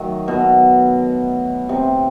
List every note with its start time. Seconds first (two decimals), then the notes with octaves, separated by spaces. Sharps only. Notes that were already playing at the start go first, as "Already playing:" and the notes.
Already playing: D#3 F#3 A3
0.28 B2
1.69 C3